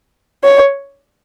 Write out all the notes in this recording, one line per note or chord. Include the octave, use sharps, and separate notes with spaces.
C#5